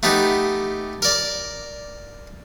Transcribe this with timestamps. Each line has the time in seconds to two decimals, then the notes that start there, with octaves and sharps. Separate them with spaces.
0.03 A3 B3 D#4 G4
1.02 A#4 D5